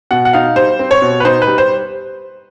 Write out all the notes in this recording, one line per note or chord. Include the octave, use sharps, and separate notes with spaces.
B2 F#5
F#5
D#4 F5
G3 C5
C4
C#5
B2
B4
D#4 C5
B4
G3
C5